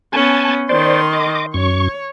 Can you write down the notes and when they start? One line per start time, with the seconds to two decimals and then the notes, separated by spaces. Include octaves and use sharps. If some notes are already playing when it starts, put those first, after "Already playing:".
0.13 B3 C#4 G#5 A5
0.69 D#3 C5 D5 C6
1.13 D#5 D6
1.54 F#2 C#5 C#6